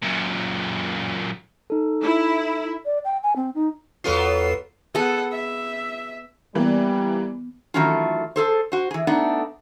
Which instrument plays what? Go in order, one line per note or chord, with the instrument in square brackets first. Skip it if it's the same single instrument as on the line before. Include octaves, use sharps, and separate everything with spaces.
[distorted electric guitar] F#2 A#2
[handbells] D#4 A4
[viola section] E4
[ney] D5
G5
G#5
C4
D#4
[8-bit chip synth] E2 A4 C7 [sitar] F#3 B3 F4
[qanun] B3 G#4 [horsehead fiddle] A4 F#5
[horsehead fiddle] E5
[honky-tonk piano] E3 A#3 [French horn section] G3 [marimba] B3
[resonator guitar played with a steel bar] D#3 E3 F#3 A3 C#4 F4
G#4 A4 C5
F#4 C5
E3 G#4
A3 B3 D4 D#4 F#5